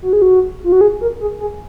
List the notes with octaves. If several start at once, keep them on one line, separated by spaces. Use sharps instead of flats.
F#4
G#4
F#4
F4
F#4
G#4
A#4
G#4
G#4